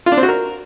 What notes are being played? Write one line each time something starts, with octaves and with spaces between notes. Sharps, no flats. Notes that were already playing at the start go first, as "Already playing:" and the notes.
F4
D4
C4
F#4
A#4